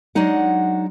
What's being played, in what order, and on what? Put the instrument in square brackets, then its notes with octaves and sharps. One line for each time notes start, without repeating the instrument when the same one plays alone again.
[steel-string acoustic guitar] F#3 G#3 D4 D#4 F#5